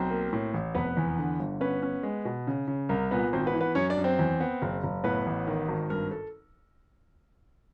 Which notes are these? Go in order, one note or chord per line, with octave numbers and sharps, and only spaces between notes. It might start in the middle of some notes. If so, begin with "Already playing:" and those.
Already playing: B1 C4 C5
A#3
A2
A1
F1 B3 B4
E2
D3
G1
B3 C#4 B4
C#4
G#3
B2
C#3
C#3
C2 A#4
A#2 B3 B4
G#1 C4 C5
B3 B4
E3
B3 B4
F#2 C#4 C#5
D4 D5
F#2
C4 C5
E2
B3
F#1
F#1
A2 B3 B4
A1
D#3
G#1
G2 A#4
A4